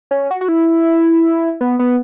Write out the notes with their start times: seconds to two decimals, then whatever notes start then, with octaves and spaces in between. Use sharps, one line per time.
0.11 C#4
0.31 F#4
0.41 F#4
0.48 E4
1.61 B3
1.79 B3